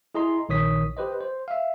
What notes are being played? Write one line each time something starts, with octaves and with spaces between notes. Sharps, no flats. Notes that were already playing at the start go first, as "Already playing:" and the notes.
E4 G#4 D#5 A#5 C6
A#1 D#3 C#5 D#6 B6
G4 B4 C5 D#5
C5
E5 F5